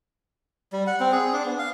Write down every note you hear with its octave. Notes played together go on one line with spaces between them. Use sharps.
G3
F#5
C4
G#4
D4
B3
F5